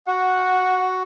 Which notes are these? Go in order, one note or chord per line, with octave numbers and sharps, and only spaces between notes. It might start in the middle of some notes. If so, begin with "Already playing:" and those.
F#4 F#5